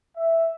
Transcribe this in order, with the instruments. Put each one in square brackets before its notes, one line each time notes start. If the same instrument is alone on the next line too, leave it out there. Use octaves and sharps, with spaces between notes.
[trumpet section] E5